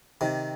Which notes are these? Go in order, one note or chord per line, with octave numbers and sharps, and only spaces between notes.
C3 D#3